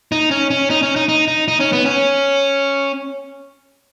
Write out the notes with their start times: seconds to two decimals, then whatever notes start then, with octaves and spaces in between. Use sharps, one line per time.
0.12 D#4
0.31 C#4
0.51 C#4
0.70 D#4
0.83 C#4
0.96 D#4
1.09 D#4
1.28 D#4
1.48 D#4
1.60 C#4
1.72 B3
1.85 C#4